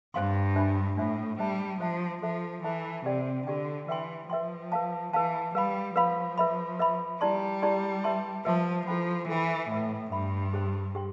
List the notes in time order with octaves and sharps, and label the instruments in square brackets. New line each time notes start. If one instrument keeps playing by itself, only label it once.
[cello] G2 [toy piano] C5 F5 C6
[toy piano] D4 F4 C5 E5 B5
[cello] A2 [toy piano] D4 F4 C5 E5 B5
[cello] G3 [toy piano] C5 E5 A5
[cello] F3 [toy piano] C5 E5 A5
[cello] F3 [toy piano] A4 C5 E5 A5
[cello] E3 [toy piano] A4 C5 E5 A5
[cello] C3 [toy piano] G4 D5 G5
[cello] D3 [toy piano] G4 D5 G5
[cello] E3 [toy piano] B4 E5 G5 C6
[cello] F3 [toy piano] B4 E5 G5 C6
[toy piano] B4 F5 A5
[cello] E3 [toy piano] B4 F5 A5
[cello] G3 [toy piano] B4 F5 B5
[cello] F3 [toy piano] B4 F5 B5
[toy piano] B4 E5 B5
B4 E5 B5
[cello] G3 [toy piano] E4 G4 D5 A5 C6
[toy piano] E4 G4 D5 A5 C6
B4 E5 A5 C6
[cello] F3 [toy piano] B4 E5 A5 C6
[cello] F3 [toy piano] E4 A4 C5 G5 B5
[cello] E3 [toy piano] E4 A4 C5 G5 B5
[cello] A2 [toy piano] B4 E5 B5
[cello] G2 [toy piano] B4 E5 B5
[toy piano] G4 C5 G5 C6
G4 C5 G5 C6